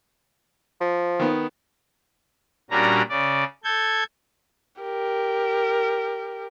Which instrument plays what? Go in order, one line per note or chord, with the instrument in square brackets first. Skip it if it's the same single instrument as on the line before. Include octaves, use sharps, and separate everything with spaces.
[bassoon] F3
[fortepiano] D#3 B3
[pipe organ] A#2 G3 C#4 D4 F#4 A#5
C#3 D5
A4 G6 G#6
[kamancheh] G4 A#4